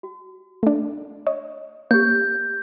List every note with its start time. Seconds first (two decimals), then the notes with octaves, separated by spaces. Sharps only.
0.03 F#4
0.63 A3 D4
1.27 C#5 D#5
1.91 A#3 G4 C#5 G6